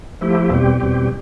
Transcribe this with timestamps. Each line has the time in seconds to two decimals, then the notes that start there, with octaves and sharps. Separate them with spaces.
0.21 F3 A3 E4 G4
0.50 E2 B2 G3 C4 G4
0.80 E2 B2 G3 C4 G4